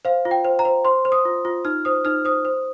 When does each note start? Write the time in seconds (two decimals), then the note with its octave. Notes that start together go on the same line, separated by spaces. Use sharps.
0.05 C5 F5
0.25 F4
0.31 G5
0.45 C5
0.59 A#5
0.65 C5
0.85 C5 C6
1.05 C5
1.12 D#6
1.25 F4
1.45 F4
1.65 D#4 F6
1.85 C5 D#6
2.05 D#4 F6
2.25 C5 D#6
2.45 C5